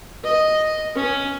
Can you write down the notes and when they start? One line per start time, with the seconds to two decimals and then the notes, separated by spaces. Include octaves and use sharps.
0.24 D#5
0.95 C#4